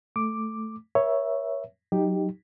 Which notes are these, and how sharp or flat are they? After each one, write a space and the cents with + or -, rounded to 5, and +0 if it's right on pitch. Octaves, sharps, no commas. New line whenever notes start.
A3 +0 D6 +0
A#4 +40 C#5 +0 E5 +0
F#3 +0 D#4 +0 G4 +0